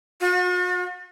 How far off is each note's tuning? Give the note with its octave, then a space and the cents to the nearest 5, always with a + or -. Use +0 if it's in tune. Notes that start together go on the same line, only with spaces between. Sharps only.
F#4 -45